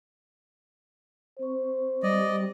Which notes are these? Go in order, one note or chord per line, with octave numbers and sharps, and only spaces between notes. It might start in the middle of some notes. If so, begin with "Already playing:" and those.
C4 C5 C#6
G3 D5 D#5